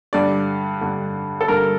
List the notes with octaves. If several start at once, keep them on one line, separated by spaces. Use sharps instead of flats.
G2 D3 D5
G2 D3
A4
G2 D3 A#4